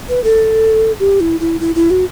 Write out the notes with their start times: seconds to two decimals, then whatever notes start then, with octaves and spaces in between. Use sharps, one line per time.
0.09 B4
0.24 A4
1.00 G4
1.20 E4
1.40 E4
1.60 E4
1.75 E4
1.91 F#4